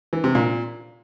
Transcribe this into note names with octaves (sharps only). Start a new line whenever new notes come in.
E3
C3
A#2